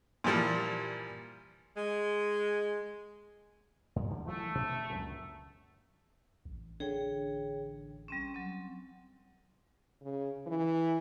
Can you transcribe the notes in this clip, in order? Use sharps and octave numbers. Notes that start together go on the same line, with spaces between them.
A#2 E3 F3 G3
G#3
G2
E2 D3 F3
E3 F#3 A3
B2 D4
C#2 F#2 A#2
A1
D3 G#4 C#5 G5
G3 C4 C#4
F#3 C4
C#3
E3